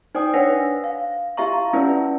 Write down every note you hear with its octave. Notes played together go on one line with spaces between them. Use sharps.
D#4 C5 D5 G5 D#6
D4 B4 C#5 F#5 G#5 A#6
F5
E4 G4 E5 F5 A#5 C#6
C#4 E4 B4 D5